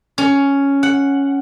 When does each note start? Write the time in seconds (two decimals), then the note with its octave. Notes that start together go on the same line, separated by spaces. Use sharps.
0.18 C#4
0.83 F#5